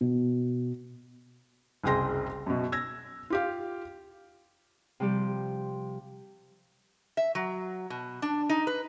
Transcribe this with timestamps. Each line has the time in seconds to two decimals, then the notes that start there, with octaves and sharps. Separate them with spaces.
0.01 B2
1.84 F#1 C2 G#4 G5 C6 A#6
2.46 F#2 B2
2.72 E6 G#6 A#6
3.30 F4 G4 F5
5.00 C3 F3 G3 G4
7.17 E5
7.35 F#3
7.90 B2
8.22 D4
8.50 D#4
8.67 B4